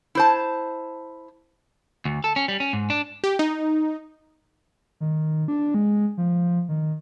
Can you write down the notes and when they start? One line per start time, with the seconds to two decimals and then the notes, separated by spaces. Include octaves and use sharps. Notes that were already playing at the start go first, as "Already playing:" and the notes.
0.15 E4 C5 A5
2.05 D2
2.24 A4
2.36 C#4
2.48 G3
2.60 C#4
2.73 G#2
2.90 D4
3.24 G4
3.39 D#4
5.01 D#3
5.48 D4
5.74 G#3
6.17 F3
6.69 D#3